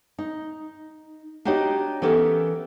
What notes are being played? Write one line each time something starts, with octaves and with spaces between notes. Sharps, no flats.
D#4
D4 D#4 F#4 G4 C#5 D#5
E3 B3 C#4 G4 A4 A#4